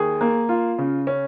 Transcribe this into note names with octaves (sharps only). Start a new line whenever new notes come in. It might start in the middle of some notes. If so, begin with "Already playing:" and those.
Already playing: D#2 G#4
A#3
F4
C#3
C#4